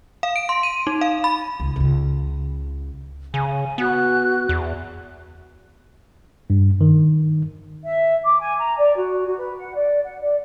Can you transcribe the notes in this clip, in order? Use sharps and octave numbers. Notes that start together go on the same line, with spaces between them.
F5
D7
C6
D#7
D#4
F5
B5
C#2
C#2 C#3
C#3 G#5
B3 F#4 F#6
E2
G2
D#3
E5
D6
G#5
A#5
D5
F#4
F#4
B4
F#5
D5
F#5
D5